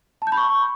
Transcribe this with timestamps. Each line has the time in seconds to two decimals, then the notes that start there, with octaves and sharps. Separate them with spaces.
0.22 A5
0.27 G6
0.32 B5
0.37 C#6